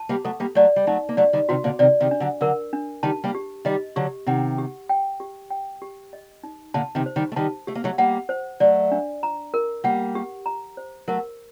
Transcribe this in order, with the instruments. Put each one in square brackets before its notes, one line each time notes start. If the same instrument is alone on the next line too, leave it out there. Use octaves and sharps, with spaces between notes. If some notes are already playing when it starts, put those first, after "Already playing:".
Already playing: [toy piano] A5
[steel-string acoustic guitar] G3 A#3
[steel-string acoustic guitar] F#3 A3 [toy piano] A4
[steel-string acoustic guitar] G3 A#3
[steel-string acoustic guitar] F#3 A3 [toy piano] D5
[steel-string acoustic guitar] G3
[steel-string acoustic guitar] F#3 A3 [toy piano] D#4
[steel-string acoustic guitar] A#3
[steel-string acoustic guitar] F#3 A3 [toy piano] D5
[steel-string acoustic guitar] D#3 G3
[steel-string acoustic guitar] C3 D#3 [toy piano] F#4
[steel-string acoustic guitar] A#2 D3
[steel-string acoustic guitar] C3 D#3 [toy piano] D5
[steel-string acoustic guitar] C3 D#3
[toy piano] D4
[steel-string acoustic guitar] D3 F#3
[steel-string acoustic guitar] D3 F#3 [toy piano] A#4
[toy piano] D4
[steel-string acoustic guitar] D#3 G3 [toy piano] A5
[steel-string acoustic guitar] G3 A#3
[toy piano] G4
[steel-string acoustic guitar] D#3 G3 [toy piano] D#5
[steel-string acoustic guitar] D3 F#3 [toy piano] G4
[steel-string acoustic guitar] C3 D#3 [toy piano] F#5
[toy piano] G4
G5
G4
G5
G4
D#5
D#4
[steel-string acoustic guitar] A#2 D3 [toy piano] A5
[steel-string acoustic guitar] C3 D#3
[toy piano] C5
[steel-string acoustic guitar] D#3 G3
A3
[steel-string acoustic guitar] D#3 G3 [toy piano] A5
[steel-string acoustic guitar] A3 [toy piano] G4
[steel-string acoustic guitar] A#3
F#3 A3
[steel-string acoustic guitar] G3 A#3 [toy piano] F#5
[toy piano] C5
[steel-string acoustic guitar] F#3 A3 [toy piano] D5
[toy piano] D4
A#5
A#4
[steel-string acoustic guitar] G3 A#3 [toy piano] F#5
[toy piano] G4
A#5
C5
[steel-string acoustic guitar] F#3 A3 [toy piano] A#4